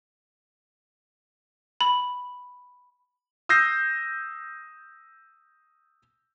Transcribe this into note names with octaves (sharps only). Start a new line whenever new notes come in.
B5
D#6 E6 G6 A#6 C7